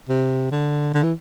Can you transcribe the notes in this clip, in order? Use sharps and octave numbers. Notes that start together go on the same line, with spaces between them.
C3
D3
D3
E3